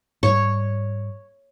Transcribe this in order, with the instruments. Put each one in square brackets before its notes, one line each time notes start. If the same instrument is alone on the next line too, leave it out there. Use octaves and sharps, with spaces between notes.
[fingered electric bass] G#2 G3 [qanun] C#5